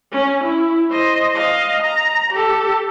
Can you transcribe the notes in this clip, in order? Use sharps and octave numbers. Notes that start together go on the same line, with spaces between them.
C#4
E4
C5 D#5
D#5 F5
A#5
G4 A4